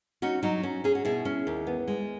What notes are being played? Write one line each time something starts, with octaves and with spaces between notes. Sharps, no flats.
C#4 D#4 F#4
F#3 D#4 F#4
C#4
C#4 G#4
F#4
B2 E4 G#4
C#4
D#2
B3
G#3